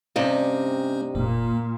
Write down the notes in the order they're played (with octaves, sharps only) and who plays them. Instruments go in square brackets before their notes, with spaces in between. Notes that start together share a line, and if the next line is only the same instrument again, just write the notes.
[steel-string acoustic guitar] G2 C3 D#4 [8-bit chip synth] A3 C#4 C5
[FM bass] F1 [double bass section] A#2 [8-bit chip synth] A#3